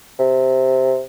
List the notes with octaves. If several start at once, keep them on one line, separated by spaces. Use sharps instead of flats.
C3